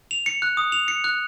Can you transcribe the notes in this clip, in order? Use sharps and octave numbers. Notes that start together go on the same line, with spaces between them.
F7
C#7
F#6
D#6
F7
C#7
F#6